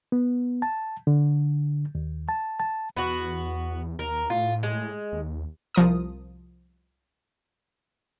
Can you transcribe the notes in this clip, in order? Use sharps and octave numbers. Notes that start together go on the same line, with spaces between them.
B3
A5
D3
D#2
A5
A5
E2 B3 F#4
D#2 A#4
A2 F4
G#3
D#2
C2 F3 A#4 D#6